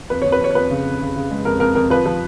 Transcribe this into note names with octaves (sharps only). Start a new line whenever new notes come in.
F2 B4
F2 C#5
B4
F2 C#5
C#5
F2 B4
C#3
F2
C#3
C#3
G#3
F2 A#4
F2 A#4
F2 A#4
F3 B4
F3